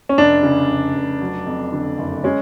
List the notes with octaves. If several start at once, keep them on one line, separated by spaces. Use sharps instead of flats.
C#4
F1 D4
C#3
F1
F1
F#3
F2
D3
F#1
G#3 C#4